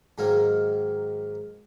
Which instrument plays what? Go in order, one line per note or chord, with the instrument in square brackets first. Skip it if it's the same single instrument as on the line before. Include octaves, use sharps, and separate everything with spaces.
[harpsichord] G#2 D#3 F#3 A#3